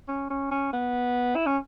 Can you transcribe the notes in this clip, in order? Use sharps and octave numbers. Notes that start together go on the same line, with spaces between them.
C#4
C#4
C#4
B3
E4
C#4